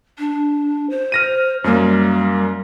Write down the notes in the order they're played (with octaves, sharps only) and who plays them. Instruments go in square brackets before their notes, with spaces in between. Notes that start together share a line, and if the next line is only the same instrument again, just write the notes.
[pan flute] D4
C5
[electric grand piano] F6 A#6 D#7
[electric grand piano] F#2 A#3 [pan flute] G3